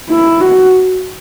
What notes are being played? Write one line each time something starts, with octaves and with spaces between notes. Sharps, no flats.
E4
F#4